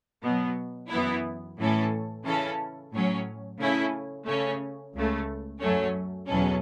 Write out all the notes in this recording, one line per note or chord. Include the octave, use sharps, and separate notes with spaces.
B2 F#3 B3
F#2 E3 B3 E4
A2 E3 C#4 A4
C#3 E3 C#4 E4 A4
A2 F#3 C#4
C#3 A3 C#4 E4
C#3 A3 C#4
C#2 C#3 A3
F#2 F#3 A3 C#4
E2 B2 F#3 C#4 A4